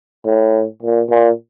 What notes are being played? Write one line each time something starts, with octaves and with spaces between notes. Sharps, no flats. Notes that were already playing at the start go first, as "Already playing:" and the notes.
A2
A#2
A#2